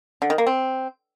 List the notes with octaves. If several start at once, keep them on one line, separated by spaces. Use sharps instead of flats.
D3
D#3
A#3
C4